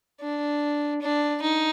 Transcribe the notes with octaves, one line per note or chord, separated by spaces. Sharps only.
D4
D4
D#4